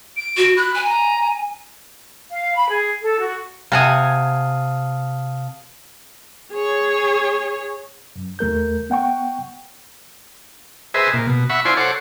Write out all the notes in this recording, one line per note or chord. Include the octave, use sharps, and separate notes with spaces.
D7
F#4
B5 F#6
G#5
A#5
F5
B5
G#4
A4
F#4
C3 F5 F#5 G#5 A5 D#6
G#4 C#5
F#2
D#2 A3 A#4 G6
B3 F#5 G5 C#6
G#4 B4 C5 D#5 E5
A#2
B2
E5 F#5 B5 C#6
E4 F4 C5 D5 G#5 C6
A4 C5 C#5 F#5 D6